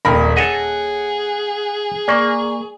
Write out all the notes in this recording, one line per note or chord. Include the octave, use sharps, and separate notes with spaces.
D#1 F2 A#4 B5 A#6
G#4 A4 C#5 D#5 F#5
A#3 D5 C#6